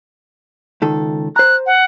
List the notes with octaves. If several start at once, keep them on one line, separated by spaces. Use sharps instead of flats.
C#2 D#3 A4
C5 A#5 F#6
F#5